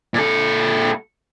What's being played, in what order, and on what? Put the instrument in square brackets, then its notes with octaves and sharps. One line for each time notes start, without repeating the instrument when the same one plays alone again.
[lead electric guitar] A#2 A4